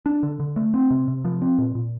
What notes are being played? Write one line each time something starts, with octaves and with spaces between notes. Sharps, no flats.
D4
D3
D3
A3
C4
C3
C3
F3
C4
A#2
A#2